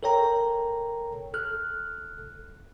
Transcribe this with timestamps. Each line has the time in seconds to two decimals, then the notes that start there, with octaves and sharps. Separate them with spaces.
0.03 A4 A#4 C#5 G5 A#5
1.34 A4 F6 F#6